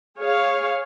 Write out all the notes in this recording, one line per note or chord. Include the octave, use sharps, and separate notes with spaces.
G#4 C#5 F5